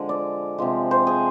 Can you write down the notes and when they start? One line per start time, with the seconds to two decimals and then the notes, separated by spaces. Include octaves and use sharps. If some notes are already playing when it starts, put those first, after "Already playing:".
Already playing: D3 F3 G#3
0.09 D5
0.58 C3 F3 G#3
0.91 C5
1.07 G#4